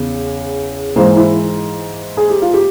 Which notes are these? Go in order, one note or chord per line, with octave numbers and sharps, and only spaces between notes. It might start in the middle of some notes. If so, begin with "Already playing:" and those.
Already playing: E2 C#3
G#2 E3 A#3 C5
E4
G#4
G4
F4
G4